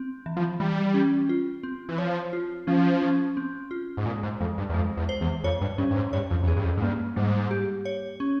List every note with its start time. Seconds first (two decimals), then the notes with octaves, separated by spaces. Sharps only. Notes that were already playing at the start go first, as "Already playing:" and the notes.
Already playing: C4
0.26 E3
0.37 F3
0.60 E3 G3
0.94 C#4
1.29 F4
1.63 C4
1.89 E3
1.98 F3 C#5
2.33 F4
2.67 F3 C#4
3.02 C#4
3.37 C4
3.71 F4
3.97 G#2
4.06 A#2 G#3
4.23 G#2
4.41 F2 G#3
4.58 G2
4.69 E2
4.74 F2 G#3
4.97 E2
5.09 C5
5.21 E2
5.44 F2 C#5
5.61 G2
5.78 G2 C#4
5.91 G2
5.96 G#2
6.13 G2 C#5
6.31 F2
6.43 F2
6.47 E2 G#4
6.56 G2
6.64 F2
6.77 G#2
6.82 G2 A#3
7.16 G#2 G3
7.51 G4
7.85 C#5
8.20 C#4